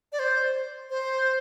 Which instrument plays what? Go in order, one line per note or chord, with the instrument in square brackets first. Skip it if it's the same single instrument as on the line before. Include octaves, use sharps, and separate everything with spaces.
[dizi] D5
C5
C5